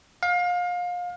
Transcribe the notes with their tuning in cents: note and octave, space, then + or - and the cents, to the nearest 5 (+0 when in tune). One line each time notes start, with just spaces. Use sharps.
F5 +30